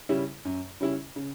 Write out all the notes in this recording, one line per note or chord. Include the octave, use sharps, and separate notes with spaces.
C#3 G3 C#4 E4
F#2
C#3 G3 C#4 E4
C#3